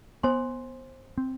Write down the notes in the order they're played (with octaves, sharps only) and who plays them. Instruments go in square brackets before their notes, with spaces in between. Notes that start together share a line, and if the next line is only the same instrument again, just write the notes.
[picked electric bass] B3 [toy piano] C5 G#5 C6
[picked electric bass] C4